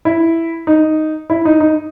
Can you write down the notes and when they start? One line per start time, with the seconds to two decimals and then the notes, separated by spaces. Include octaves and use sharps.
0.05 E4
0.67 D#4
1.30 E4
1.45 D#4
1.60 D#4